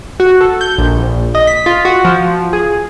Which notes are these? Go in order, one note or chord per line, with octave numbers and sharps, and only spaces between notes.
F#4
A4
G6
A#1
A#1
D#5
B6
F4
F#4
F3
G#4